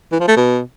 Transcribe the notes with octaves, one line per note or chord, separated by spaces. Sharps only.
E3
F3
A3
B2